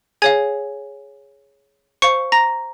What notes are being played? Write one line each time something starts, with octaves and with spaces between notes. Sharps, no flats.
G#4 C#5 F5 G#5 G#6
C5 F5 C#6 C#7
A#5 A#6